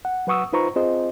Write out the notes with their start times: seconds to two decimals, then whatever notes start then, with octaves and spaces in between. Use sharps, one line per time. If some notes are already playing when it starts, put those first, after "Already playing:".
0.05 F#5
0.27 F#3 B4 F#5 C#6 D#6 E6
0.53 D#4 F4 B4 C5 A#5 C#6
0.76 C4 F4 G#4 C5 D#5